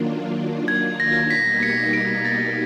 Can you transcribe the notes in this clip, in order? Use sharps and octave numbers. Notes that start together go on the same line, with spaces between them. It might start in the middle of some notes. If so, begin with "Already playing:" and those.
Already playing: D#3 F#3 A#3 D4 F4
G#6
A#6
B2 G3 A#3 D#4 B6
C#7
D7
A6